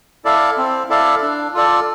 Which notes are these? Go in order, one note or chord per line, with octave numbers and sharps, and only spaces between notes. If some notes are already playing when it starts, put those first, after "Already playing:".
E4 A4 D5 F5
C4
E4 A4 D5 F5
D4
F4 A4 D5